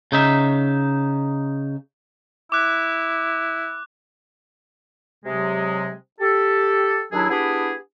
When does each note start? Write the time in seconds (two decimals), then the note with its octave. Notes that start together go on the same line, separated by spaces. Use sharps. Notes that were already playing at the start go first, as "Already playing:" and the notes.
0.12 C#3 D#4 E5
2.52 E4 D6 F#6
5.25 C3 F#3 G#3
6.20 G4 A4
7.12 D#2 F#3 D4 E4 G#4 E6
7.30 B3 D4 E4 G4 G#4